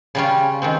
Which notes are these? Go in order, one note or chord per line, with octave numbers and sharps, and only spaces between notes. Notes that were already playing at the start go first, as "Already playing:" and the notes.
C#3 G3 C#4 F4
D#3 G#3 C4